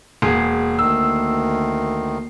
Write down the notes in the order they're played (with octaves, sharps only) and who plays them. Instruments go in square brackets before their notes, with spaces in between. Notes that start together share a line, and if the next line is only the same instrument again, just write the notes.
[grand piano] E1 G#4 [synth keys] A#3 C7
[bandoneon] D2 D#3 [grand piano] E6